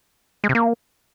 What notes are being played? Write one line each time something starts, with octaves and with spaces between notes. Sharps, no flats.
G#3
C3
A#3